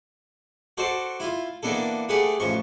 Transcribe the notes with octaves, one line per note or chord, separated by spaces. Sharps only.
F#4 A4 C5 D5
E4 F4
E3 A#3 B3 D4 A4
A3 G4 G#4 B4 F#5
A1 E3 F3 C#6